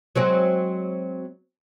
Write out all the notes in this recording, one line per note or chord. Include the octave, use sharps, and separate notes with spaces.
F#3 G#3 C4